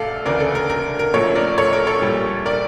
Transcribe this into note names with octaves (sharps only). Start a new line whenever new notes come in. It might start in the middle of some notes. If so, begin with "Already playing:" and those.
Already playing: A1 A2 A4 D5 F5
D2 C#3 E3 A#4 D5
A4
A#4
A#4
A#4
A1 A2 F3 A4 C#5
A#4 D5
A4 C#5
A#4
A4 C#5
A#1 A#2 G3
A#4 D5